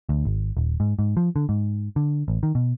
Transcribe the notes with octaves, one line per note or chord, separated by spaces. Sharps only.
D2
G#1
D#1
G#2
G#2
F3
D3
G#2
D3
A1
D#3
B2